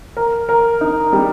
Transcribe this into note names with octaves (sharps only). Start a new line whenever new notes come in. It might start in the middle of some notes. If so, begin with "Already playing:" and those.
A#4
A#4
D#4
G3